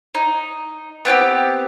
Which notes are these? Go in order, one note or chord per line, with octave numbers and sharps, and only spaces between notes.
D#4
B3 C4 F4 G4